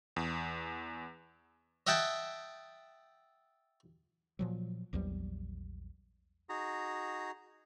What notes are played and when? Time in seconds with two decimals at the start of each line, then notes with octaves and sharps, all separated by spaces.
0.16 E2
1.87 D#5 E5 F#5 G5 A5
4.39 A#2 F3 F#3
4.93 A#1 E2 F#3 G3
6.49 D#4 F#4 G#4 A#5